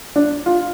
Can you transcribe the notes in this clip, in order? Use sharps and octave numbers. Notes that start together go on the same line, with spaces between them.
D4
F4